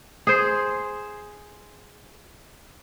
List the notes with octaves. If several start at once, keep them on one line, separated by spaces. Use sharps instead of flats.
G#4 C5